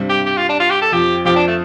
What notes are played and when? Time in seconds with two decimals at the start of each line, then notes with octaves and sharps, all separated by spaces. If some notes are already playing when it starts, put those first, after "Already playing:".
Already playing: G2 C3 G3 C4
0.09 G4
0.26 G4
0.37 F4
0.49 D4
0.60 F4
0.70 G4
0.82 A4
0.92 F2 F3 G4
1.25 F2 F3 G4
1.36 D4
1.47 A3